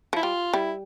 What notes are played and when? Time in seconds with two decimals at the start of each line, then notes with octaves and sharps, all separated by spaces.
0.13 F3 E4
0.23 G3 F4
0.54 G3 E4